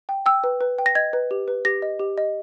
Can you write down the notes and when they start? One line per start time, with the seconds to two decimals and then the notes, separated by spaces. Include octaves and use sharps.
0.09 G5
0.26 G5 E6
0.44 B4
0.61 B4
0.78 G5
0.86 A#6
0.95 D#5 G#6
1.13 B4
1.31 G4
1.48 B4
1.65 G4 A#6
1.82 D#5
2.00 G4
2.18 D#5